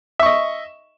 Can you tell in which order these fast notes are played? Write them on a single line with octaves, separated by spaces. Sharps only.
E5 C#6 D#5